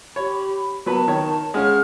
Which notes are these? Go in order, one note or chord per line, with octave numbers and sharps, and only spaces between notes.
G4 C#5 B5
F#3 B3 A#4 B4 A5
D#3 C#5
G#3 C#4 F5 F#5 F6